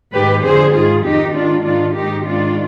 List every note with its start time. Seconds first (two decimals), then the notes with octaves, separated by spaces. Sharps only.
0.13 G#2 D#3 G4 B4
0.43 F2 D3 G#4 C5
0.73 G#2 D#3 F4 G#4
1.04 F2 D#3 D#4 G4
1.34 G#2 D#3 D4 F4
1.64 G#2 D#3 D4 F4
1.94 G#2 D#3 D#4 G4
2.25 G#2 D#3 D4 F4